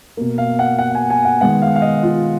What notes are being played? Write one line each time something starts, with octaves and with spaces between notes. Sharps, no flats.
B2 A#3
F5
F#5
F#5
G#5
G#5
F#5
D#3 G#3 B3 F#5
F5
F5
D#5
F4